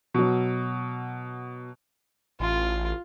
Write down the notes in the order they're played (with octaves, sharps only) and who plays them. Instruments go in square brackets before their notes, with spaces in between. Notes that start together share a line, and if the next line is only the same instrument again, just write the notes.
[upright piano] B2 F#3
[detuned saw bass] A1 [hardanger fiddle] F4